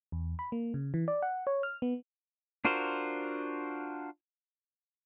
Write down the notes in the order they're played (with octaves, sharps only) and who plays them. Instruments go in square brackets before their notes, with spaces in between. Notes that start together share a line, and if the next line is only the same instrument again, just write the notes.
[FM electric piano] E2
B5
A#3
C#3
E3
D5
F#5
C#5
F6
B3
[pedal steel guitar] D4 F4 F#4 A#4 C5